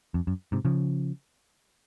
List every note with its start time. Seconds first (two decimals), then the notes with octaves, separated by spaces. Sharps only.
0.14 F2
0.27 F#2
0.52 G#2 C3
0.65 C#3 F3